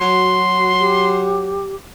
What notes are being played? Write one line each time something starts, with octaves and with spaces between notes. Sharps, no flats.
F#3 F#4 C6
G4